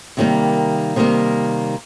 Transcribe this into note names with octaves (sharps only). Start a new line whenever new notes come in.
C3 D#3 G3 A#3
C3 D#3 G3 A#3